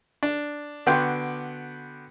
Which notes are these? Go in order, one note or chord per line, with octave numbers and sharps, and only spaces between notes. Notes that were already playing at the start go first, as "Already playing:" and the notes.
D4
D3 B3 F#4 G5 C6 D6